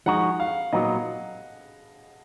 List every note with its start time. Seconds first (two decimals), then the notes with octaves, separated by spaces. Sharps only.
0.06 F3 G#3 D#4 F#4 F#5
0.40 F5
0.73 A#2 F#3 B3 D#4 D#5